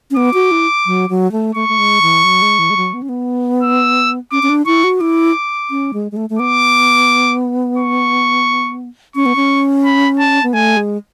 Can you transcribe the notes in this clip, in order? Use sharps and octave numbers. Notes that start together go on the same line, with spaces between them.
C#4
B3 D6
F#4
E4
F#3
F#3
A3
A3 C#6
A3
G#3
E3
F#3
G#3
E3
G#3
F#3
B3
C#4
B3
E6
C#4 D6
C#4
D4
E4 C#6
F#4
E4 D6
C#4
G#3
G#3
A3
A3
B3 D6
C#6
C#4 C#6
B3
C#4
B5
A5
B3
A3 G#5
G#3